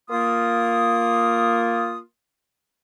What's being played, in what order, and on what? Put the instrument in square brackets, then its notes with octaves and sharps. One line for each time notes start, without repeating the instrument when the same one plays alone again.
[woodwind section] A#3 F4 D#6